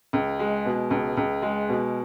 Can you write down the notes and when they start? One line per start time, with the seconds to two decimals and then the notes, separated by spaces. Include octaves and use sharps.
0.13 C#2
0.39 G#3
0.65 B2
0.91 C#2
1.17 C#2
1.42 G#3
1.69 B2